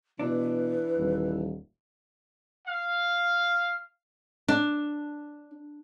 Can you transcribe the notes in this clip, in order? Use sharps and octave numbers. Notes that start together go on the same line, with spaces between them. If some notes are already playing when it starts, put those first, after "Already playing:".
B2 E3 D4 B4
D#1
F5
D4